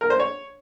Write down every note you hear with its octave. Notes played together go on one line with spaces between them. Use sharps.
A#4
C5
C#5